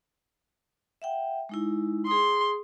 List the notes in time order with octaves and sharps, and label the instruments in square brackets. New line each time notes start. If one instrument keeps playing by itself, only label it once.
[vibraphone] E5 F#5 G5
G#3 D#4 E4
[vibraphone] G#4 D#6 [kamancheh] C6